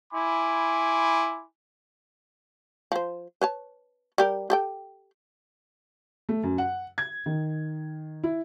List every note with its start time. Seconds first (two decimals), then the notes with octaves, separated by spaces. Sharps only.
0.13 E4 G#5 B5 C6 D6
2.92 F3 C5
3.41 B4 C#5 A5
4.18 G3 G4 A#4
4.50 G4 A4 G5
6.29 A3
6.43 F#2
6.58 F#5
6.98 G#6
7.26 D#3
8.24 E4